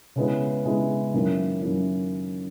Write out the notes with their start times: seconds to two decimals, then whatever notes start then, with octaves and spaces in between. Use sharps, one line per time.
0.16 C#3 G#3 B3 E4
0.65 C#3 G#3 B3 E4
1.14 F#2 D#3 A#3 C#4 E4
1.62 F#2 D#3 A#3 C#4 E4